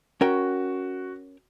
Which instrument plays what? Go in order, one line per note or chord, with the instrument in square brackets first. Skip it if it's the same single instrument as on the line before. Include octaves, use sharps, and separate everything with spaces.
[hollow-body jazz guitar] C#4 A#4 G5 [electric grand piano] F#4